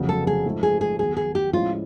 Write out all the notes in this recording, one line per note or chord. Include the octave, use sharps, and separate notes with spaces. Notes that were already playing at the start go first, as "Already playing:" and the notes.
Already playing: F1 F2 C#3 F#3 B3
A4
G#4
G#2 F3 A3
G#4
G#4
D#2 D#3 F#3 B3 G#4
G#4
G4
A2 F3 G#3 C#4 E4 F4